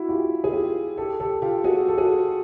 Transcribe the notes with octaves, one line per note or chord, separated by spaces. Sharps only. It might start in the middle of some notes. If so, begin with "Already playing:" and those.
Already playing: E4 F#4
F4 G4
G#4
F4 G4
G4 A4
G4 A4
F4 G4
F#4 G#4
A4
F#4 G#4